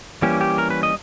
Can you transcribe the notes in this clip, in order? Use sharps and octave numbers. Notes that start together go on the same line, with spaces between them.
E3 G3 A#3 C#4 G4
G4
A#4
B4
D#5